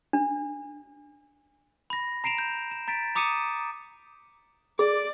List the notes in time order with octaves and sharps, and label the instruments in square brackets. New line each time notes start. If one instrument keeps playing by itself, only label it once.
[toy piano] D4
[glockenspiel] B5 A#6
A#5 C7 D7 E7 F7
G6
E7
A#5 A6 B6 D7
A#5 D6 D#6 C#7 D#7 E7
[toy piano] G#4 [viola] D5